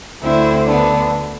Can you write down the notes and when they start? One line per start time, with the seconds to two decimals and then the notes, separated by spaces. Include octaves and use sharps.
0.23 D2 D3 C4 E4
0.66 B3 D4